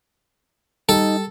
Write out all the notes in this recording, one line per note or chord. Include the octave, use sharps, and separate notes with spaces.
G3 D#4 A4